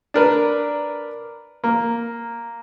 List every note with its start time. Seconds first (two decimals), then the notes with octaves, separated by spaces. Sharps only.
0.14 D4 A#4 B4
1.64 A#3